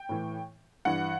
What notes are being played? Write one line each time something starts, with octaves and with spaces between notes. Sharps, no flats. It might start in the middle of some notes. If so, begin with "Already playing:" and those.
Already playing: G5
A2 E3
G2 E3 F#5